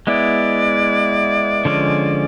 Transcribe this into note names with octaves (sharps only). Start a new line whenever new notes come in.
G#3 B3 E4 D5
D3 F3 G#3 C#4